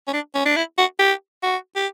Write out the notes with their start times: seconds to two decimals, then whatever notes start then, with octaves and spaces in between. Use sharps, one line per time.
0.08 C#4
0.13 D4
0.35 C#4
0.46 D4
0.56 E4
0.78 F#4
0.99 G4
1.43 F#4
1.76 G4